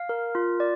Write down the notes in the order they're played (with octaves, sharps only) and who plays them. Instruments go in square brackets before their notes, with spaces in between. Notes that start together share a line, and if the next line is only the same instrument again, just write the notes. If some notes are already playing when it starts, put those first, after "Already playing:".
Already playing: [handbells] F5
A#4
F4
D5